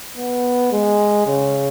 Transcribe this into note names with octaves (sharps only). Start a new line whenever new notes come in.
B3
G#3
C#3